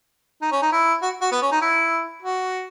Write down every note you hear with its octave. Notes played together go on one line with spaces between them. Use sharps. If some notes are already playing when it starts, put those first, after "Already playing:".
D#4
C#4
D#4
E4
F#4
F#4
B3
C#4
D#4
E4
F#4